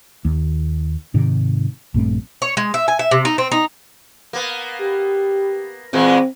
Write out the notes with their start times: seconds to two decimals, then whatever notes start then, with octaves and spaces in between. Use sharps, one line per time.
0.25 D#2
1.14 G#2 C3 D#3
1.94 A#1 G2 A3 C4
2.42 C#5
2.57 G#3
2.74 E5
2.88 G#5
2.99 E5
3.11 C3
3.25 D#4
3.38 C4
3.52 D#4
4.33 A#3 B3
4.81 G4
5.93 A#2 E3 G#3 C4